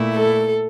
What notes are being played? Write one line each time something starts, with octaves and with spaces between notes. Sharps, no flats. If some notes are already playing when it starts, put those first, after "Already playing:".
Already playing: A#2 A3 E4
A4